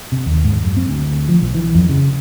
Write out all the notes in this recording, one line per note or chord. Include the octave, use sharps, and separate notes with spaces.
C3
D#2
G#2
F#2
C4
D2
F3
B1
E3
F2
C#3